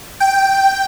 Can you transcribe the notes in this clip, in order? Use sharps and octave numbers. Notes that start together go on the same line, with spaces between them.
G5